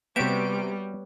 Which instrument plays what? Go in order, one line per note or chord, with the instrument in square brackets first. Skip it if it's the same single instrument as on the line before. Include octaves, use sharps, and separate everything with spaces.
[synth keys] C3 D7 [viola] G3 [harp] B3 C#5 [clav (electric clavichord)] F#4 G4 E5